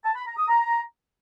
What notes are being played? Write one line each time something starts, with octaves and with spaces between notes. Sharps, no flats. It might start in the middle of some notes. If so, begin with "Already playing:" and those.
A5
B5
A#5
D#6
A#5